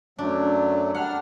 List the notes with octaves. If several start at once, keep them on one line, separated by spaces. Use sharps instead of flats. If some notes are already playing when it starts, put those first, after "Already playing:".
F#2 F#3 A3 D4
G3 D4 F#5 F6